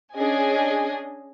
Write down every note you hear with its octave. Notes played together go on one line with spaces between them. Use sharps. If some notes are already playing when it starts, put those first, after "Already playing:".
C#4 D4 G#4 D#5 G#5